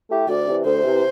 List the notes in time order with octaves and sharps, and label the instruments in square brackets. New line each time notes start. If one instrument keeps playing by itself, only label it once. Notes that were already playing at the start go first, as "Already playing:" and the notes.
[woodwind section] A3 E4 G4
[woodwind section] D2 [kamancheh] D5
[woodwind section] C3 E3
[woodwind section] D2 [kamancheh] C5
[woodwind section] C3 E3